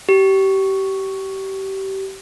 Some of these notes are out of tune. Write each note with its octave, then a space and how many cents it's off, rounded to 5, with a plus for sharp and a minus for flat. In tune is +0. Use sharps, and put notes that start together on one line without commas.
G4 -25